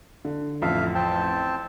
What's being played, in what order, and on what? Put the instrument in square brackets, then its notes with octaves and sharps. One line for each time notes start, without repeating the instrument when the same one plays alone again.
[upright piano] D3
[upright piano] A1 F2 [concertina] E5 F5
[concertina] C4 G5 A5